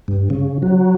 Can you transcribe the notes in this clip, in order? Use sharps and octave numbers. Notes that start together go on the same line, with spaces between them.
G2
C#3
F#3